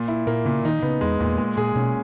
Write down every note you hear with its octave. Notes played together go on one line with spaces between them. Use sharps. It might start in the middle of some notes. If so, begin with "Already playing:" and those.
Already playing: A#2
E4
A#2 A#3
A#2 C#3
D#3 D#4
C#3 B3
E2 G#3
E2 A#2
G#3
A#2 G#4
B2 C#4